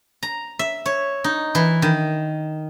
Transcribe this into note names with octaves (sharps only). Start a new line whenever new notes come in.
A#5
E5
C#5
D#4
E3
D#3